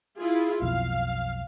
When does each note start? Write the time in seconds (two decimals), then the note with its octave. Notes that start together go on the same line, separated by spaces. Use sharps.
0.18 E4 F4 G#4
0.62 B1 F2 B2 F5